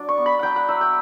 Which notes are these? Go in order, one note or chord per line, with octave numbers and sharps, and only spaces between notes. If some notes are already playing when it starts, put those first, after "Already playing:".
Already playing: F#3 D4
C#6
B3
B5
F#3 F#5 G5
F#5
F#3 E5
G5